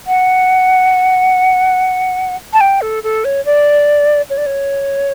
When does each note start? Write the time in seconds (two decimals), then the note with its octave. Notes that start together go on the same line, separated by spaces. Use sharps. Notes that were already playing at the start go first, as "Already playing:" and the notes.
0.07 F#5
2.53 A5
2.61 G5
2.81 A4
3.04 A4
3.25 C#5
3.45 D5
4.30 C#5
4.38 D5
4.46 C#5